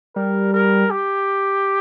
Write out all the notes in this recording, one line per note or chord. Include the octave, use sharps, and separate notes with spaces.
G3 A#4
A#4
G4